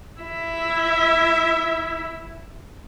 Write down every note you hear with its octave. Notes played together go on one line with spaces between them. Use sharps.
E4 E5